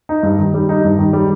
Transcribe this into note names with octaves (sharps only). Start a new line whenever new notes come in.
D#4
G2
D#3
G3
D#4
G2
D#3
G3